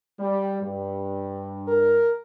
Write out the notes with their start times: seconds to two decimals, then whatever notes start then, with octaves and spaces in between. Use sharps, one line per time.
0.19 G3
0.62 G2
1.68 A#4